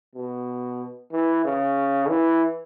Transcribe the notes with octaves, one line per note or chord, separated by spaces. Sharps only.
B2
E3
C#3
E3